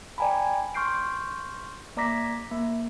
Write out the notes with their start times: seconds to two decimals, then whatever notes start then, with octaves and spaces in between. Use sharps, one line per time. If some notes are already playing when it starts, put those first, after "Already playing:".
0.18 D5 G5 G#5 A#5 B5
0.74 C6 C#6 F6 G6 C7 D7
1.97 A#3 D5 A#5 D6 A#6 B6
2.51 A#3